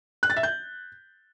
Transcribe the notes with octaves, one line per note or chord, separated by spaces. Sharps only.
F#6
A6
E5
G6